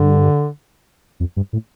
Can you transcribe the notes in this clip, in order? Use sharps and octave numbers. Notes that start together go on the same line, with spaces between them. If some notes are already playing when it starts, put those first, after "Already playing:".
Already playing: G2 D3
F2
G2
A2